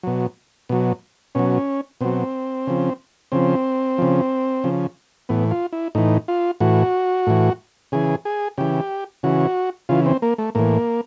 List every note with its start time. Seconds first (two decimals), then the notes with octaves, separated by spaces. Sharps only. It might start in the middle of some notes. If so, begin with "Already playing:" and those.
0.03 B2 F#3
0.69 B2 F#3
1.35 B2 F#3 C#4
2.01 B2 F#3 C4
2.67 C#3 F3
3.32 C#3 F3 C4
3.98 C#3 F3
4.64 C#3 F3
5.29 A2 E3 B3
5.51 F4
5.73 E4
5.95 A2 E3 D#4
6.28 F4
6.60 A2 E3 F#4
7.27 A2 E3
7.92 C#3 E3 G#4
8.25 G#4
8.58 C#3 E3 G4
9.23 C#3 E3 F#4
9.89 C#3 E3 F4
10.06 C4
10.22 A#3
10.38 A3
10.55 A2 E3 A#3